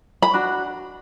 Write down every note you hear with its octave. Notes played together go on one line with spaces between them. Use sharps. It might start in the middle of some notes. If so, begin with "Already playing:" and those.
B5
D4 F#4